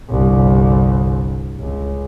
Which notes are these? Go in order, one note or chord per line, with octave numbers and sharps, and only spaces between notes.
G1 C2
C#2